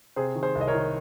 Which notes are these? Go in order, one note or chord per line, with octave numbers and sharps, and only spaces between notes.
C3 G#4 C5
D#3
G#4 C5
C2
D#5
A#4 C#5
D#3